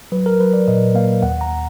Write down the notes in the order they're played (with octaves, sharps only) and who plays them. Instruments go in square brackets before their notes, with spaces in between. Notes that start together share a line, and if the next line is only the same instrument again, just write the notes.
[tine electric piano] F#3 B4
A#4
F#3 B4
D5
A#2 D#5
A#3 F5
D#2 F#5
A#5